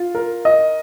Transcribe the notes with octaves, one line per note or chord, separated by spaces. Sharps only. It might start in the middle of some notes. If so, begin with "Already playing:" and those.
Already playing: F4
A#4
D#5